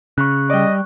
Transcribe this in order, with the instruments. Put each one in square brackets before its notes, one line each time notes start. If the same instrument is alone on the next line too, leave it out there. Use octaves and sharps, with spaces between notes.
[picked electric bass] C#3 [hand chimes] C#6 F#6
[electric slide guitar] G3 D5 [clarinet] D#5